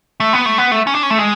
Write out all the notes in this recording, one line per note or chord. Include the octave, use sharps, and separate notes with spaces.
A3
B3
A3
B3
A3
C#4
D4
C#4
A3
G#3